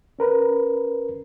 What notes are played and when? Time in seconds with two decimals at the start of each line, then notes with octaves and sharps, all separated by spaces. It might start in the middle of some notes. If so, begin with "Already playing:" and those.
0.19 C#4 A#4 B4